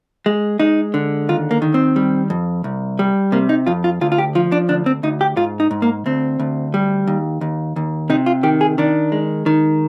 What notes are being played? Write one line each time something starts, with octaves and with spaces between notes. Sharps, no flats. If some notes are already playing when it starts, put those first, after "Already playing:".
G#3
G#3 D#4
D3
D#2 F4
A#3
D#3
C4
G3
F2
C2
G3
C3 A#3
D#4
F2 F4
F4
D2 F4
F4
G4
F3 F4
D4
D2 D4
C4
D2 D#4
G4
G#2 F4
D#4
G#2
A#3
D2 C4
D2
G3
D#2
D#2
D#2
C3 D#4
F4
D#3 G4
G#4
D#3 D4
G#3
D#3